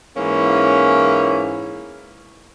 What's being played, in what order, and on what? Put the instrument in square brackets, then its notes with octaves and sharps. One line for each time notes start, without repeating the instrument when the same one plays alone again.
[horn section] G#2 E3 A#3 C#4